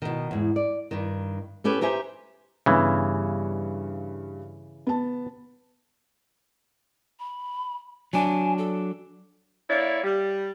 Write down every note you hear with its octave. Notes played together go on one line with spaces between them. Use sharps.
B2 D#3
E2 G#2
D5
G2 D#3
B3 C#4 G4 A4 B4
D#4 G4 C5 E5 G#5
G2 C#3 E3 G3 B3
B3 A5
B5
F#3 D4 G#5
A4
A#3 E4 C#5 D5
G3